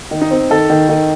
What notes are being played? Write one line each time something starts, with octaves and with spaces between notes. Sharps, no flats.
D#3
D#4
C4
D#3 A4
D#3
D#3